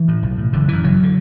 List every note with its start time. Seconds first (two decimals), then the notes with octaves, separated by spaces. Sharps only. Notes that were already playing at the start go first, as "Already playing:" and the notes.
Already playing: E3
0.08 A2
0.22 B1
0.38 A2
0.53 F#1 D3
0.68 F#2 D3 E3
0.83 F#1 F#3
1.03 D3